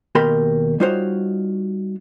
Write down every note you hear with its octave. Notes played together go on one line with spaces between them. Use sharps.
D#2 B2 G4 A#4 B5 C6
G3 D#4 F4 F#4 C5 C#5